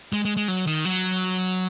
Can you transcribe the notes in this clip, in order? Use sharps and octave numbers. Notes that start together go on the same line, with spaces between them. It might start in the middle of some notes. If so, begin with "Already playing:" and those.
G#3
G#3
G#3
F#3
D#3
F#3